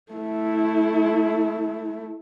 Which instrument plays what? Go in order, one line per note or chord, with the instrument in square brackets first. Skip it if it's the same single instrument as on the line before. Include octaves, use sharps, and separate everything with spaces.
[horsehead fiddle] A3 E4